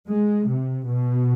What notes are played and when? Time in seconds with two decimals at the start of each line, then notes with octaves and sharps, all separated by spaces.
0.09 G#3
0.48 C3
0.87 B2